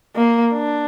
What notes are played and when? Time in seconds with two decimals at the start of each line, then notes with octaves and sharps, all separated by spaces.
0.16 A#3
0.53 D4